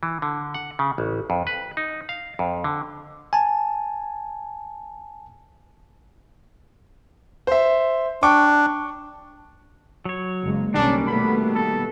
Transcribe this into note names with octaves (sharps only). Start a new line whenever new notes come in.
E3
D3
F#5
C#3
A1
F2
B4
D#4
F5
F2
D3
G#5 A5
C5 E5
D4 G5 C#6 D6
F#3 C#5
F#1 G#3 A#3
B1 D#3 G3 A#3 C#4 D4
B2 A3 B3 B5
A4